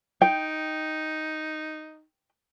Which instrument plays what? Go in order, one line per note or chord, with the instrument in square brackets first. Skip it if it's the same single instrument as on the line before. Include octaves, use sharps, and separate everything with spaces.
[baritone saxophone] D#4 [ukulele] G5